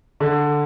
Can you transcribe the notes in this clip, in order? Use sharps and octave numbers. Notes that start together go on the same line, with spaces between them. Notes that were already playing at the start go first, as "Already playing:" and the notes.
D3